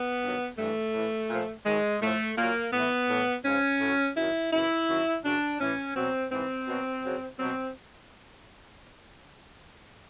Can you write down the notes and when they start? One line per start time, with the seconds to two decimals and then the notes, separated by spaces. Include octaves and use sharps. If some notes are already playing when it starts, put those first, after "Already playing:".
Already playing: B3
0.23 G2 D#3 F#3
0.58 G2 E3 A3
0.94 A2 E3
1.30 A#2 F3
1.66 G#2 D#3 F#3 G#3
2.01 A2 F3 A3
2.38 A#2 F#3 A#3
2.73 A2 E3 B3
3.09 A2 E3
3.45 G#2 F3 C#4
3.81 A2 F#3
4.16 F#2 D#3 F#3 E4
4.53 F#2 C#3 E3 E4
4.89 F#2 D#3 F#3
5.24 F#2 C#3 F#3 D4
5.60 A2 E3 C#4
5.96 B2 F#3 C4
6.32 G#2 E3 C4
6.68 B2 F#3
7.04 F#2 C#3 F#3
7.39 B2 F#3 C4